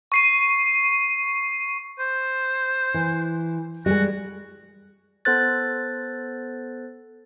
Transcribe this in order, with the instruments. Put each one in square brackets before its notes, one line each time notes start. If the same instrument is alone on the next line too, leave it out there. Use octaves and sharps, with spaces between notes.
[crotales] C#6 C7 D#7
[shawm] C5
[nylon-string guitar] E3
[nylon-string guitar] G3 G#3 [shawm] F#4
[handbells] B3 A4 C5 F#6 A6